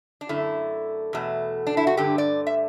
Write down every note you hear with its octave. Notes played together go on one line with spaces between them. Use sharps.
D4
F#2 D3 A3 E4
E2 B2 A3
D4
E4
F#4
G2 D3 A3 G4
D5
E5